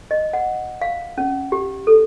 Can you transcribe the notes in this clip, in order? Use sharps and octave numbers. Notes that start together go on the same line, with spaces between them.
D#5
F#5
F5
C#4
G4
A4